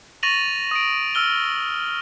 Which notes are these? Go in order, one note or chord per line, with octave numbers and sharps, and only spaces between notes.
C#6 A6 A#6 D#7 F7 F#7
D#6 D7
E6 F6 G7